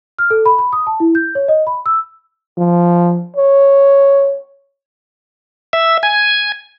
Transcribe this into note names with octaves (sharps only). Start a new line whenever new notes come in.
F6
A4
B5
B5
D#6
A5
E4
G6
C#5
D#5
B5
E6
F3
C#5
E5
G#5